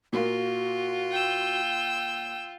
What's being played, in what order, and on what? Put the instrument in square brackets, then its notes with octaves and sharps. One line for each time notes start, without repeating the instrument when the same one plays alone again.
[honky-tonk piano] A#2 A#3 [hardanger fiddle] F4 [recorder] F#4
[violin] G5 E6